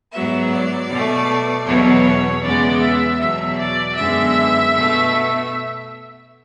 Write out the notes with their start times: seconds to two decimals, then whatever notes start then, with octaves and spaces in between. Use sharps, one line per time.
0.13 G#2 F#3 B3 E5
0.52 D5
0.89 B2 A3
1.66 E2 B2 F#3 B3 C#5
2.44 E2 C#3 G#3 B3 D5
2.81 E5
3.19 E2 B2 F#3 E5
3.58 D5
3.96 F#2 D3 G#3 B3 E5
4.73 B2 A3